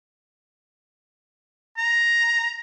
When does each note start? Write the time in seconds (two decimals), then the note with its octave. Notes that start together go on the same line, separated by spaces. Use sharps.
1.78 A#5